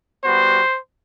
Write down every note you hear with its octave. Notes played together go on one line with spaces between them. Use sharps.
G3 B3 F#4 C5